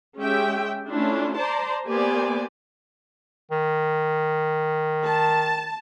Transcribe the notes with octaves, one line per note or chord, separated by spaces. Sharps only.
G#3 C#4 G4 E5 G5
A3 C#4 D4 E4 F4
C5 D5 A5 A#5 C6
A#3 B3 G4 C5 D5 G#5
D#3
A5